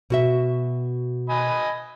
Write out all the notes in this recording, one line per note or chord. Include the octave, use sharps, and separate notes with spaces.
B2 F#4 E5
D#5 G#5 B5